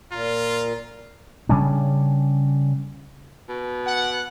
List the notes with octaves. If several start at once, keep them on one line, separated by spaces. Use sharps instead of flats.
A#2 F4 A#5
C#3 G3 C#4 D4
B2
F#5